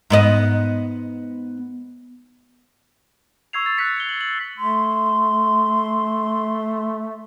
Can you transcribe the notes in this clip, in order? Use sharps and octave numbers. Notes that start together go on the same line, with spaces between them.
G#2 B3 D#5
C#6 E6 G#6 C7 F7
C#6 E6 A6
F#6 A6 B6 C#7
C#7 F7 G7
F#7
F#7
A3 C6